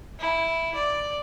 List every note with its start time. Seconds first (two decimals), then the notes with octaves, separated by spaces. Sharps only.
0.19 E4
0.74 D5